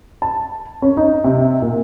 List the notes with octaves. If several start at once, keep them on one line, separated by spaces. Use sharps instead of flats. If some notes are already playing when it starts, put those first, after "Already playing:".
A5
C#4
D#4
C3
A#2